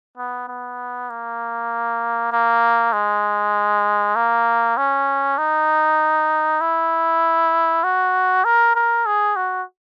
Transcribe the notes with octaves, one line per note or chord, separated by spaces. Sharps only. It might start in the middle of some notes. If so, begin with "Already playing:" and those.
B3
B3
A#3
A#3
G#3
A#3
C#4
D#4
E4
F#4
A#4
A#4
G#4
F#4